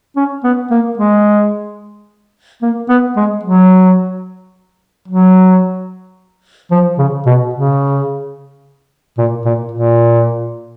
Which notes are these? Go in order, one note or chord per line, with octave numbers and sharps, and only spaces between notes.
C#4
B3
A#3
G#3
A#3
B3
G#3
F#3
F#3
F3
C#3
B2
C#3
A#2
A#2
A#2